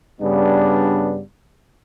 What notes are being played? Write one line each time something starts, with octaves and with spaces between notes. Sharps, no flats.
G2 C#3 G3 B3 D4